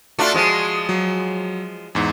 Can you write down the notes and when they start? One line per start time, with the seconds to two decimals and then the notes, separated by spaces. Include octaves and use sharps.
0.19 A3 D4 F4 F#4
0.34 F3 G#3
0.89 F#3
1.95 E2 G#2